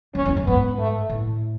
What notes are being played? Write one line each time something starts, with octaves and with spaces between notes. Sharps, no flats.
F#2 C#4
E2
F#2
G#2 B3
A3
A2